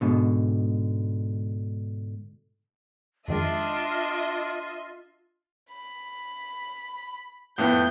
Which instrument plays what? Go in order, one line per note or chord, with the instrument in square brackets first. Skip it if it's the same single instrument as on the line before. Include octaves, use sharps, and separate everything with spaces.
[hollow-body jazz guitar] G#2 B2 D3
[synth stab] F2 D#3 G#3 [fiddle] D4 [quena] F4 [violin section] D#5 E5
[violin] B5
[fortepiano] F2 A2 B3 [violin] G6